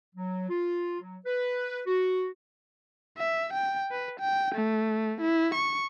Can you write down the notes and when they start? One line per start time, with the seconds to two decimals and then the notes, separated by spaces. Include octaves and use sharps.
0.15 F#3
0.49 F4
1.00 F#3
1.25 B4
1.87 F#4
3.18 E5
3.54 G5
3.91 B4
4.20 G5
4.55 A3
5.22 E4
5.55 C#6